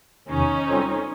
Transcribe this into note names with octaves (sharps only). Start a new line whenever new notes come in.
E2 C3 D#3 C#4 D#4
G3 C4 F4 A4 C5